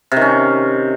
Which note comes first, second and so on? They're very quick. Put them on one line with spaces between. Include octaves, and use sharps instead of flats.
C3 D#3 C#4